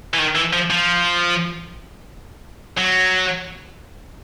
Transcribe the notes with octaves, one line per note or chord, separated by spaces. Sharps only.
E3
D#3
E3
F3
F3
F#3